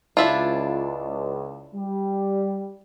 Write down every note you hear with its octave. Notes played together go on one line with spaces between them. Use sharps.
C#2 D4 E4 F4
G3